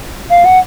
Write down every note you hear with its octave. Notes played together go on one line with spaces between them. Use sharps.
F5
F#5